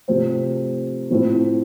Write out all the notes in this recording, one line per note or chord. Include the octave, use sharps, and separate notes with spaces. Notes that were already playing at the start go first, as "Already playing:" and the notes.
C3 F3 A3 C4
A2 F3 A3 C4 E4